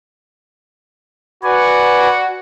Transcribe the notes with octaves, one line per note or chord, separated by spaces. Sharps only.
F#4 B4 D5 G#5